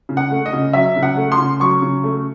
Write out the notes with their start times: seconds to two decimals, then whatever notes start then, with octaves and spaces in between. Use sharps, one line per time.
0.09 C#3
0.17 F#5
0.31 A3
0.46 D#5
0.53 C#3
0.73 F#3 E5
0.96 C#3
1.03 F#5
1.17 A3
1.32 C6
1.39 C#3
1.60 F#3 C#6
1.82 C#3
2.04 A3